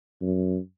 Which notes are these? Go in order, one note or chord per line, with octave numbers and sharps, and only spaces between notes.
F#2